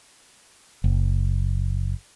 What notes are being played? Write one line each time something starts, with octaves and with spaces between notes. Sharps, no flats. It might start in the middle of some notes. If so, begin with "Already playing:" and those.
F#1